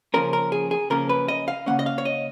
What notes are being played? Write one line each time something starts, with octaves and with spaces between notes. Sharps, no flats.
C#3 F3 A#3 C#4 A#4
A#4
G#4
G#4
C#3 F3 A#3 C#4 A#4
B4
D#5
F5
C#3 F3 A#3 C#4 F#5
D#5
F5
C#5
D#5